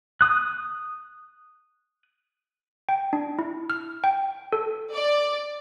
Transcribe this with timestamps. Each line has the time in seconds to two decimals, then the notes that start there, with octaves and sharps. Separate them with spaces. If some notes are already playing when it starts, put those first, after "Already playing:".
0.21 D#6 F#6
2.89 G5
3.13 D4
3.39 E4
3.70 F6
4.04 G5
4.53 A4
4.94 D5